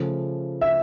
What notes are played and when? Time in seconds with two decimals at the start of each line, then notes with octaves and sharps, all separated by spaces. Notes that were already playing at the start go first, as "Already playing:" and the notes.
Already playing: C#3 F3 A3
0.61 E5